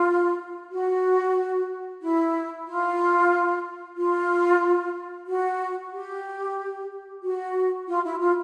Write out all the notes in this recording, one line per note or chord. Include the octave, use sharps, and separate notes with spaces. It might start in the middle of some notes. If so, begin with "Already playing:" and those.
Already playing: F4
F#4
E4
F4
F4
F#4
G4
F#4
F4
E4
F4